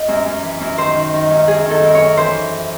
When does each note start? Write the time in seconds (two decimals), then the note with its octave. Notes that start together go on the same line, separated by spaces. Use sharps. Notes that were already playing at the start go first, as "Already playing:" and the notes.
Already playing: D#5
0.08 F#2
0.25 F#2
0.43 E3
0.60 F#2
0.78 D#3 C5
0.95 D#3
1.13 D#3
1.30 F#2
1.48 F#2 G#4
1.65 D#3
1.71 A4
1.83 F#2
1.95 C#5
2.01 F#2
2.17 E3 C5